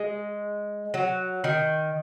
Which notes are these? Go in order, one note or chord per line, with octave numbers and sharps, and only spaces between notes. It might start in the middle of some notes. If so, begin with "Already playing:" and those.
Already playing: G#3
F#3
D#3